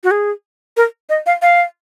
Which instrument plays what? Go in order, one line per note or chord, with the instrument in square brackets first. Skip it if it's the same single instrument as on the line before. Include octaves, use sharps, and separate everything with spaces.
[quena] F#4
G#4
A#4
D#5
F5
F5